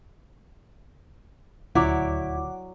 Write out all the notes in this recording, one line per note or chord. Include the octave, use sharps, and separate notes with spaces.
D#1 D2 F#3 E4 C#5 D5 F#5 D6